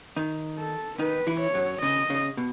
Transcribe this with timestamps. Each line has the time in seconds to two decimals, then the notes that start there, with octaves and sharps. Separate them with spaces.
0.16 D#3 D#4
0.58 A4
0.99 D#3 D#4 B4
1.27 E3 E4
1.40 C#5
1.54 F#2 F#3
1.82 C#3 D#5
2.10 C#3
2.37 B2